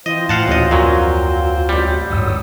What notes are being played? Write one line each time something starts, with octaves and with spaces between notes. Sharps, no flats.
E3 C4 E4 F4 C5 D#5
A2 F5 F#5 A5
A1 D2 A#2 E3 F#4 D#5
F2 A#2 F#3
A1 G3
D1 G1 G#2 F#3 F#5 D#6 E6